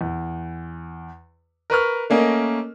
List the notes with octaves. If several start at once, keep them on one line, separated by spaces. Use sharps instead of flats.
E2
A#4 B4 C#6 F6
A3 A#3 C#4 A#4 D#5